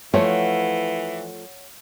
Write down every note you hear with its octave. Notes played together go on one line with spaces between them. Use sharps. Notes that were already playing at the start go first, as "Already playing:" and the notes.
E3 F3 A3 C#5 F5 F#5